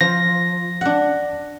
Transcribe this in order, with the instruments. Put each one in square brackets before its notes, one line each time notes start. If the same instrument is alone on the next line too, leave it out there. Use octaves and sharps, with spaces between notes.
[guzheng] F3 [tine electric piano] A#6
[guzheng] D4 F#5